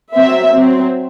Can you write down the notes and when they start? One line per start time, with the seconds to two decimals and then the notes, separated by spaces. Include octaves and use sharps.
0.15 F#3 C4 E5
0.51 F#3 C4